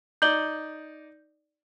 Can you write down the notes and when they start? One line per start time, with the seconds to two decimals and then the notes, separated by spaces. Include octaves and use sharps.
0.22 D#4 D5 G6 F#7 G7